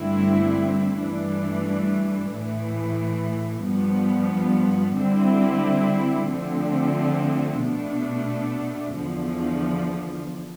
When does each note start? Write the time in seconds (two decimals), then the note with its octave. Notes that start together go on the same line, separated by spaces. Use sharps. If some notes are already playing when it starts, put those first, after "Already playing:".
Already playing: G2 D3 A3 C4 E4
0.99 G2 E3 A3 D4
2.32 A2 E3 A3
3.65 G2 F3 B3
4.98 D3 G3 C4 E4
6.31 D3 F3 A3 C4
7.64 B2 A3 D4
8.96 E2 D3 F3